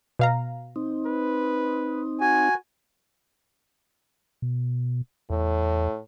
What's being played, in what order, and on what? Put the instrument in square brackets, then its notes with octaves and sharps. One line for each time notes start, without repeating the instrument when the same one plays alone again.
[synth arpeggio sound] B2 F5 A#5
[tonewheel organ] C4 D#4
[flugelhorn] B4
[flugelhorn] F#4 [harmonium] G#5
[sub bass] B2
[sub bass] E2 [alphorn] A2